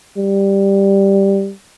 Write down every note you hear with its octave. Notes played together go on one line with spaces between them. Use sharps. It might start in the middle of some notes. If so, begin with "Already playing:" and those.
G3